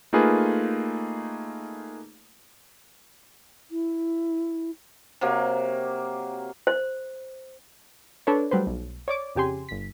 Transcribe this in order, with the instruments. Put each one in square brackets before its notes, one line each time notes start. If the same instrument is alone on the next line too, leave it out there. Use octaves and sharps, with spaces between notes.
[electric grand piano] A3 A#3 D#4 F4 G#4 B4
[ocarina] E4
[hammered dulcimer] C3 F#3 A#3
[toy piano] C5
[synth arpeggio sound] D4 A4 B4 C#5
F#3 G3 A3 B4 C5
B1
C#5 D5 D6
F2 C#3 G4 G#5 C6
G1 B6